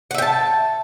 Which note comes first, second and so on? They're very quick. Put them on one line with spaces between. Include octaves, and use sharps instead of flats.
F#5 E5 G5 A5